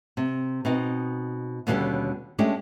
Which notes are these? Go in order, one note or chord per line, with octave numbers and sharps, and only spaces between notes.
C3
B2 C4 D#4
D#2 B2 D3 G3 C#4
G#3 A3 C#4 D4 G4